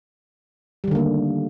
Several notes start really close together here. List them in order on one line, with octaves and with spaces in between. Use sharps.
G3 D#3 D3 A#3 A3